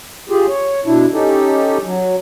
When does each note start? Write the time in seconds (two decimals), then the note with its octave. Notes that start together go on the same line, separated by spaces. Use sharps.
0.30 F4 G4 G#4
0.48 C#5
0.86 B2 D4 E4
1.13 C#4 D#4 G4 A4
1.84 F#3